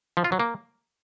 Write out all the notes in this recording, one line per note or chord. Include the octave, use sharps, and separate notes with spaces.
F3
F4
F#3
A#3